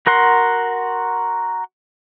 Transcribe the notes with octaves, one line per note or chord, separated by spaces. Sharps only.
F#4 A#4 F#5 C6